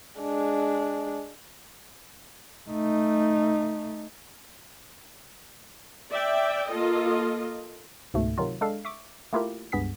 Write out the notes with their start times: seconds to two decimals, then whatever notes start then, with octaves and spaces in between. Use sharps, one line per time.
0.21 G#3 D4
2.70 A3 D#4
6.10 D5 E5 G5
6.70 A#3 F4 A4 D#5
8.14 C#2 G#2 B2 A3
8.38 C3 D#3 F#3 F4
8.61 G#3 D4 A4 F5
8.85 E5 C#6 D6
9.33 A3 A#3 E4 F4 G4 A#4
9.72 C#2 G2 B3 G#4 B6